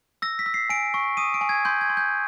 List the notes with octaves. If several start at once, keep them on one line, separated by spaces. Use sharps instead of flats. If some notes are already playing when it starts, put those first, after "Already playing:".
E6 A#6
B6
E6
C7
G#5 D7
C#6
D#6 D#7
D7
G#5
G#6
C6 G6
G#6
C6
G6